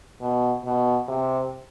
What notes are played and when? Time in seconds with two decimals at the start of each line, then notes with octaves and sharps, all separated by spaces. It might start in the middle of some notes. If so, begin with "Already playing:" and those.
0.21 B2
0.65 B2
1.08 C3